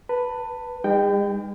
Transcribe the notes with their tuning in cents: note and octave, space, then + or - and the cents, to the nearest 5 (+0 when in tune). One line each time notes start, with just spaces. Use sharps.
B4 +0 A5 +25
G#3 -45 D#4 -15 G5 +0